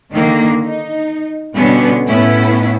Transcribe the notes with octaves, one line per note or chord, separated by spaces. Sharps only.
D3 D#3 A#3
D#4
B2 D3 G3 B3 C#4
A2 B3 C#4 E4